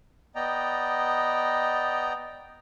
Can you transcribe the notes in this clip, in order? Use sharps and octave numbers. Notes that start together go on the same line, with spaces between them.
B3 D5 D#5 G5 A#5